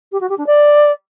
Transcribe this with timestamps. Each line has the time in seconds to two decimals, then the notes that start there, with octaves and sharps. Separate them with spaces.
0.12 G4
0.20 F#4
0.29 G4
0.38 D4
0.46 D5